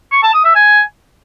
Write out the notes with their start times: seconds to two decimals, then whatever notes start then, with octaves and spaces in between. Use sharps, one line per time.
0.12 C#6
0.23 A5
0.34 D#6
0.44 E5
0.55 G#5